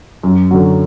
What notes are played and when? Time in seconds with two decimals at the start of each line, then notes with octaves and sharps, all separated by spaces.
0.23 F#2
0.51 D3 F#3